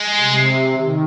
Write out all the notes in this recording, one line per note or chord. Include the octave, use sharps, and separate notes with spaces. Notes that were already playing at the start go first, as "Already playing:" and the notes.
Already playing: G#3
C3
D#3